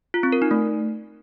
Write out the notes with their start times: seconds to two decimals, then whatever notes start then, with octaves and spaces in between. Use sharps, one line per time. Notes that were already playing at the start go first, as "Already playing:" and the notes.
0.14 F4
0.23 C4
0.32 A#4
0.42 D#4
0.51 A3